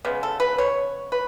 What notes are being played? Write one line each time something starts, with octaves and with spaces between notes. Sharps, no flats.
C#3 G#3 B3
A4
B4
C#5
B4